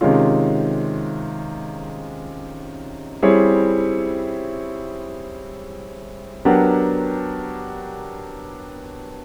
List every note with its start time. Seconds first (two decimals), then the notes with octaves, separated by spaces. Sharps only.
0.01 C3 D#3 G#3 C#4 F4
3.23 G3 C4 E4 G#4 C#5
6.45 F#3 B3 D4 G4 A#4